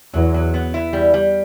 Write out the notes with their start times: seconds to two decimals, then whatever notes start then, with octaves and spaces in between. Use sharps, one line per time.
0.14 E2 F#3
0.34 F#3
0.54 B3
0.74 E4
0.93 E2 G3
1.14 G3